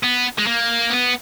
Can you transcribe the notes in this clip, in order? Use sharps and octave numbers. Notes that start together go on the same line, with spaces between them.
B3
G#3
A#3
B3